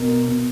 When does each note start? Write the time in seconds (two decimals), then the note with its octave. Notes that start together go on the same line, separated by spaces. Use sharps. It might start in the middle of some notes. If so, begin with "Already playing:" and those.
Already playing: B2 A#4
0.26 B2